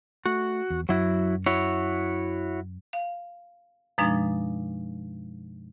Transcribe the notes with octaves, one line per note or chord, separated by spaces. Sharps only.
A3 F#4
E2
F#2 F#3 E4 F#4
E4 F#4 C#5
F5
F#2 B2 F3 G#3 D4 D#4